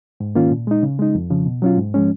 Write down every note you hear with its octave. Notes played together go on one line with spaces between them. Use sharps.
G#2
D#3 A#3 C#4 F4
A#2
G#3 D#4
C#3
G#3 D#4
F2
C#3 F3
B2
F#3 C#4 F4
G#2
F3 G#3 C#4